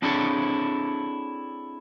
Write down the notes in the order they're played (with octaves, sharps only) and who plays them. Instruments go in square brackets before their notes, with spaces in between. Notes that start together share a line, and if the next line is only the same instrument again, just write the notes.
[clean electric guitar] C4 D4 E4 G#4 A4 C#5